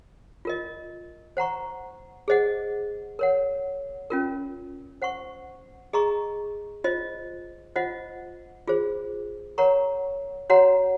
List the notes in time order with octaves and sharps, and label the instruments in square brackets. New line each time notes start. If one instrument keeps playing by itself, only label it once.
[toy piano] F4 A#4 D#5
C5 F#5 A#5 C#6
G#4 C5 D#5 F#5
A#4 C#5 F#5
C#4 F4 A#4
C5 F#5 C#6
G#4 D#5 A#5 C#6
F4 C5 D#5
F4 C5 D#5 F#5
F4 G#4 C5
A#4 C#5 F#5 A#5 C#6
F#4 C#5 F#5 A#5